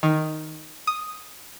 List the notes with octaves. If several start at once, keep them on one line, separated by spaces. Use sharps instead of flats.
D#3
D#6